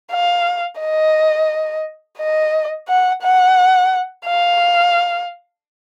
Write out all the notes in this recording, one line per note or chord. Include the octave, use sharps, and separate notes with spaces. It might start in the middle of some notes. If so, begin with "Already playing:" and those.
F5
D#5
D#5
F#5
F#5
F5